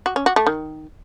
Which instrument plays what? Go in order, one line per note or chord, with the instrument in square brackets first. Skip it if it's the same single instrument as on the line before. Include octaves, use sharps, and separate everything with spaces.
[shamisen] F#4
C#4
F#4
A3
D#3